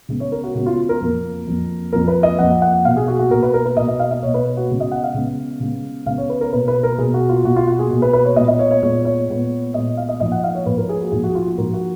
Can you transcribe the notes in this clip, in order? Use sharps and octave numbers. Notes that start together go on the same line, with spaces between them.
C#3 G#3 B3
C#5
A#4
F#4
C#3 G#3 B3 F#4
F4
A#4
F2 F3 A#3
F2 F3 A#3
F2 F3 A#3 A#4
B4
D#5
F2 F3 A#3 F#5
F#5
B2 A#3 F5
G#4
F#4
F#4
B2 A#3 A#4
B4
A#4
B4
B2 A#3 D#5
D#5
F5
D#5
B2 A#3 C#5
B4
F#4
C#3 G#3 B3
D#5
F#5
F5
C#3 G#3 B3
C#3 G#3 B3
C#3 G#3 B3 F5
C#5
B4
A#4
B2 A#3 B4
B4
A#4
B2 A#3 G#4
F#4
F4
B2 A#3 F#4
F4
F#4
G#4
B2 A#3
B4
B4
C#5
A#2 G#3 B3 D#5
D#5
C#5
C#5
A#2 G#3 B3 C#5
C#5
A#2 G#3 B3
A#2 G#3 B3 D#5
F5
D#5
G#2 F3 A#3 D#5
F#5
F5
C#5
G#2 F3 A#3 B4
A#4
G#4
F#4
G#2 F3 A#3 G#4
F#4
F4
F#4
G#2 F3 A#3 A#4
F#4